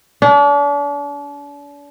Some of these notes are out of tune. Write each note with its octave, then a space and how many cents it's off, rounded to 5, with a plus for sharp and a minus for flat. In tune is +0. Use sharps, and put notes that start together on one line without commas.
D4 -40